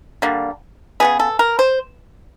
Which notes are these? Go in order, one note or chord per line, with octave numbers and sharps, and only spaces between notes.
D3 G3 A#3
C#3 F#3 B3 G#4
A4
A#4
C5